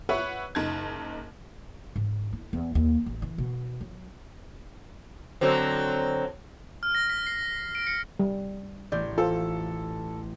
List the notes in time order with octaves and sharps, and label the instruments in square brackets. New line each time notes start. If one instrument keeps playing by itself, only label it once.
[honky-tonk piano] B4 C#5 E5 F#5 C#6 F#6
F#1 D#4 A5 G#6
[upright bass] G#2
E4
E2
D#2
A1
E3
B2
F#3
[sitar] D3 F#3 C4
[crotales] F6
A#6
B6
C7
D7
C#7
[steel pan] G3
[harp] A1 [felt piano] D5 G6
[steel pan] F4 C5 [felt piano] A4